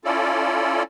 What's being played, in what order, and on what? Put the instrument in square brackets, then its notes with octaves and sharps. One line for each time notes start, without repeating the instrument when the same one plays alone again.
[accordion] C#4 E4 F4 A4 D5